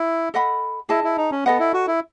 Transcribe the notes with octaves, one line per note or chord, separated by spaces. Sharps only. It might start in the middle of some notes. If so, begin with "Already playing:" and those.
Already playing: E4
A4 D#5 F#5 B5
E4 G#4 D#5 A5
E4
D#4
C#4
B3 A4 D#5 F#5
E4
F#4
E4